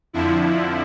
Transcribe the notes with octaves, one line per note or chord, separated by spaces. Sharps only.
F2 D3 F3 E4